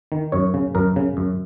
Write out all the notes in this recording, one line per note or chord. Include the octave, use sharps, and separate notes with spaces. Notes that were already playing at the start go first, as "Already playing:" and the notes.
D#3
F#2 C#5
C#3
F#2 A#4
C#3
F#2